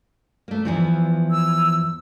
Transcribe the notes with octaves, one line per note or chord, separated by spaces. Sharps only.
A3 A#3
E2 E3 F3
E6